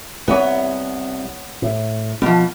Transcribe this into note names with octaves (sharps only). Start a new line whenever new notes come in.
C2 B3 C#5
A2
B2 F3 B3